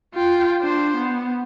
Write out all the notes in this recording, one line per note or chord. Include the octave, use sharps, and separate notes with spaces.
F4 G5
D4 C5
B3